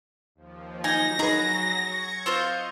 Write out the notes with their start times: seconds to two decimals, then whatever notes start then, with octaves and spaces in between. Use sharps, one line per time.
0.35 D#2 F3
0.84 F#3 D#4 G#5 A#6
1.19 D#4 G#4 B4 A#5
1.77 C#6 G#6 C#7
2.26 C4 F4 C5 D#5